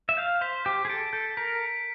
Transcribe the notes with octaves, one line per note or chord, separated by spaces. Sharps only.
E5
F5 G6
C5 B6
G4 G6
G#4
A4 D7
A4 G6
A#4 B6
C#7